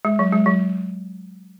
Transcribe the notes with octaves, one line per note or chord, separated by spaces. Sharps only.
G#3
F#3
G#3
F#3